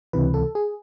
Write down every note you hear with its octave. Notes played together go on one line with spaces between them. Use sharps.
C#2 C3 E3 B4
A4
G#4